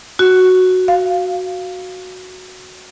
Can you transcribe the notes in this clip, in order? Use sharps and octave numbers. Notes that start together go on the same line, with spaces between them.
F#4
F5